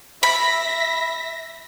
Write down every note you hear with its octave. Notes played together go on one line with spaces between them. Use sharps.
E5 B5 A#6 B6